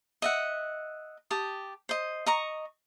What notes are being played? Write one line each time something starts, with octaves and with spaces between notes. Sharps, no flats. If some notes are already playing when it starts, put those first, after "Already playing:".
D#5 E5 F#5
G4 A5 D#6
C5 D#5
D#5 A#5 C#6